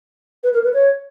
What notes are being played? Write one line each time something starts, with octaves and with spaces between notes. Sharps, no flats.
B4
A#4
B4
C#5